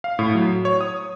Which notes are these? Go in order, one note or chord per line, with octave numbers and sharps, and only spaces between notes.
F5
A2
F#3
C#5
D#6